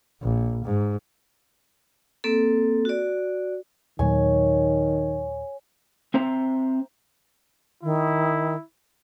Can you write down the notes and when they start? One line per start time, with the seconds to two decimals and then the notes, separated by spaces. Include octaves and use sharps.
0.23 A#1
0.64 G#2
2.24 A#3 C4 A4
2.85 F#4 D5
3.99 D#2 A#2 D#3 F#3 C#5 G#5
6.14 C4 C5 E5 A#5
7.83 D#3 E4